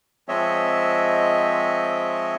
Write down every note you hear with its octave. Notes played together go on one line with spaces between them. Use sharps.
F3 G#3 C4 C#5 D#5 E5